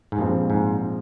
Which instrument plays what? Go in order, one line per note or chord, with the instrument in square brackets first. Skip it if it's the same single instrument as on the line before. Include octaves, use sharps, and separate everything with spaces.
[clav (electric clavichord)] G#2
[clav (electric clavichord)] G2 [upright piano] A#2 F3 G#3 C4
[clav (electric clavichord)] G#2